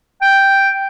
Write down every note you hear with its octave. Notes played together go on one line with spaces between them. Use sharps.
G5